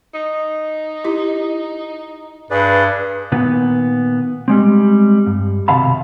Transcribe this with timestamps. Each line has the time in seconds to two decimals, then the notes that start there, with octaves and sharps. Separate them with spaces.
0.14 D#4
1.04 E4 G4
2.51 G2 D4 G#4 B4 D5
3.32 A#2 D#3 B3
4.48 G3 G#3 C4
5.27 G2
5.68 B1 C3 D#3 F5 A5 B5